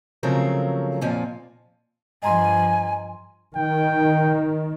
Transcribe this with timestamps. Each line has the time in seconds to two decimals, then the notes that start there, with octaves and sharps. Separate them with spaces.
0.23 C#3 F3 F#3 A3 C4 A#4
1.01 F2 A#2 F3 G#5
2.23 G2 F3 D#5 G#5 A#5 C6
3.55 D#3 G5